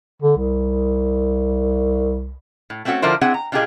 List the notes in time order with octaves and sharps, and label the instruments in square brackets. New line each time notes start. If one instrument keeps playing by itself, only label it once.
[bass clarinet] D3
C2
[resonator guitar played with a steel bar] A2
A3 C4 C#4 D#4 F#4 A4
D3 F3 D4 E4 A#4 C5
C4 D4 E4 G#4 F#5
A#5
A#2 D4 F4 G4 G#4 D#5